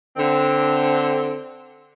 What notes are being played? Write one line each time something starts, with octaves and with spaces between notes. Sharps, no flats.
D3 C4